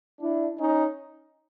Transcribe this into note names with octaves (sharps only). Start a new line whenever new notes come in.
D4 E4
C#4 D#4